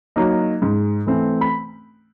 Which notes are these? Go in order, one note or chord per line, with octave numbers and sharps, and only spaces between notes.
F#3 A#3 D#4
G#2
E3 A3 C4
B5